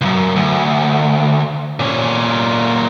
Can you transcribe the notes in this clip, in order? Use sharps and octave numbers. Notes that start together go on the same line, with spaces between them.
C#2 F#2
D2
A#2 C#4